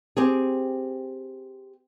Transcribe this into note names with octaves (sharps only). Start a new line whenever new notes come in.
C4 G4 G#4